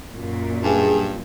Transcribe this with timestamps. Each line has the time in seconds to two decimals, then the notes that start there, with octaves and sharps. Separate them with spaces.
0.12 F#2 A#2
0.63 G2 G#4